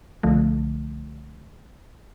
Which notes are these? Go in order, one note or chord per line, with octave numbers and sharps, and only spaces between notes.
C2 D3 F3 A3